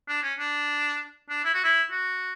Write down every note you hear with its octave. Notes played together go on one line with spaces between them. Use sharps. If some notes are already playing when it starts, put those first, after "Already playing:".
D4
C#4
D4
D4
E4
F#4
E4
F#4